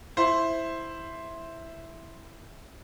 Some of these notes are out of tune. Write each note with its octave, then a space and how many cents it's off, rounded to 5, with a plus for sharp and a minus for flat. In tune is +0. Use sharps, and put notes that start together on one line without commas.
E4 +0 C5 +0